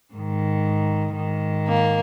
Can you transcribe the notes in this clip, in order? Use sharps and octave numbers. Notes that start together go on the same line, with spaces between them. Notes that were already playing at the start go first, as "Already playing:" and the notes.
G#2 D#3
G#2 D#3
A#3